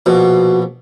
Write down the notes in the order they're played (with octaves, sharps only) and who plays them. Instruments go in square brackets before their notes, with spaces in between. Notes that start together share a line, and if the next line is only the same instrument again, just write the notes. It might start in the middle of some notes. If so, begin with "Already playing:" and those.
[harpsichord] A#1 B2 [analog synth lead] F#4